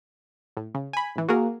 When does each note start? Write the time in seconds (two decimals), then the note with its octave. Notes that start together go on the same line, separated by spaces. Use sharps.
0.57 A2
0.75 C#3
0.93 G#5 B5
1.16 A1 E3
1.28 A#3 F#4 G#4 A#4